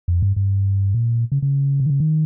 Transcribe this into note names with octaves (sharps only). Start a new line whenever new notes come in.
F2
G2
G2
A#2
C#3
C#3
C3
D#3
C#3
D#3